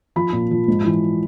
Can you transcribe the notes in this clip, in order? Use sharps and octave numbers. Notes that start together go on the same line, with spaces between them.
F3 B5
A#2
F3
G#2
E3